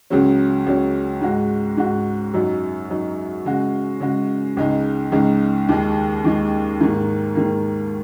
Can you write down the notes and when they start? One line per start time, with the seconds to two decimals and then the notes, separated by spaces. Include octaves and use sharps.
0.10 C#2 C#3 F#3 C#4
0.66 C#2 C#3 F#3 C#4
1.21 G#2 G#3 F#4
1.77 G#2 G#3 F#4
2.34 F#2 F#3 D#4
2.90 F#2 F#3 D#4
3.45 C#3 G#3 F#4
4.01 C#3 G#3 F#4
4.57 C#2 C#3 G#3 D#4
5.12 C#2 C#3 G#3 D#4
5.69 D#2 D#3 G#3
6.24 D#2 D#3 G#3
6.80 G#2 D#3 A#3
7.35 G#2 D#3 A#3